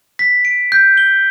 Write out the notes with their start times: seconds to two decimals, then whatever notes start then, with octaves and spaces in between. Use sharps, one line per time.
0.19 B6
0.45 D7
0.72 G6
0.97 G7